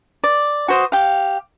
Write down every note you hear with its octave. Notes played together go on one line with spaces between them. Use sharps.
D5
F#4 C5 D#6
G4 F5